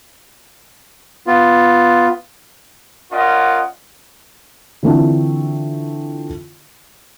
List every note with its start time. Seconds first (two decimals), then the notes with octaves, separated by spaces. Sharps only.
1.27 B3 F4
3.12 C#4 F4 A#4 D5 D#5 F#5
4.83 D3 E3 A3 C4 D4 F4